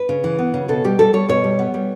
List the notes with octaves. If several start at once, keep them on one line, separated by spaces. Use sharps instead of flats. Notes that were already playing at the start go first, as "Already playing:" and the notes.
Already playing: B4
C#3
E3
B3
C#3
B2 A4
G3 G4
G3 A4
G3 C#5
B2 C#5
G3
B3
G3